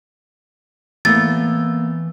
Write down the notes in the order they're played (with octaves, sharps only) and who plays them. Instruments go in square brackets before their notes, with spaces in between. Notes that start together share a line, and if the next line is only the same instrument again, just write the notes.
[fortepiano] A2 [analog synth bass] E3 [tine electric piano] A#3 B3 [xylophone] A6